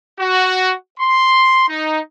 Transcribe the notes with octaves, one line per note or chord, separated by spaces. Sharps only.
F#4
C6
D#4